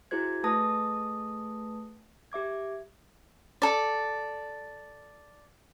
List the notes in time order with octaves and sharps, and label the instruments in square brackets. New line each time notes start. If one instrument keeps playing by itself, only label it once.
[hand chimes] E4 F#4 G#4 C5 G#6
A3 G#4 B4 A5 D#6 A#6
G4 E5 D6 G#6
[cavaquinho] A4 D5